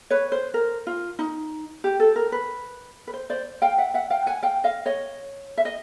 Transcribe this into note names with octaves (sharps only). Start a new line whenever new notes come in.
B4 C#5
C5
A#4
F4
D#4
G4
A4
A#4
B4
B4
C5
C5 D5
F5 G5
E5 F#5
E5 F#5
F5 G5
F#5 G#5
F5 G5
D#5 F5
C#5 D#5
E5
D#5